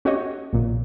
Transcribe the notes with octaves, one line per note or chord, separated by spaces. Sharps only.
C#4 F#4 G4 C#5 D#5
A#1 A#2